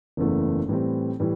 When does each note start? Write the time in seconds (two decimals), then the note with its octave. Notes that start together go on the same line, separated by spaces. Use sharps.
0.17 F#1 E2 C#3 E3 A3
0.69 A2 E3 G3 C4
1.20 A2 E3 G3